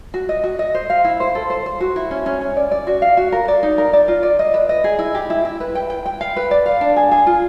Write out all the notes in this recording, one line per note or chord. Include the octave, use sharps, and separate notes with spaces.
F#4
D#5
F#4
D#5
C5
F5
E4
C5
A4
C5
C5
F#4
E4
C#4
C#4
C#4
D5
D5
F#4
F5
F#4
A#4
D5
D#4
A#4
D5
F4
D5
D#5
B4
D#5
G#4
E4
G4
E4
E4
B4
G5
G5
G5
F5
B4
D5
F5
D4
G#4
G#4
F4